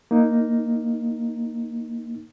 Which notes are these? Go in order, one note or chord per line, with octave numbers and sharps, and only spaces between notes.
A#3 D#4